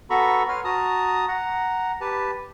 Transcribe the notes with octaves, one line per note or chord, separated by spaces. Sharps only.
B3 F#4 A4 A#5 B5 C#6
B4 C#5 C6 F6
F#4 A5 A#5 D#6
F#5 A#5
G4 B4 A5